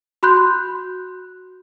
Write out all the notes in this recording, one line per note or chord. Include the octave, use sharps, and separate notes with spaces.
F#4 B5 C6 F#6 G6